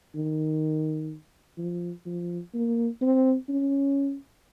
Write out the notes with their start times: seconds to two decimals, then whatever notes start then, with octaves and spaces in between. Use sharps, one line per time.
0.15 D#3
1.58 F3
2.06 F3
2.54 A#3
3.02 C4
3.49 C#4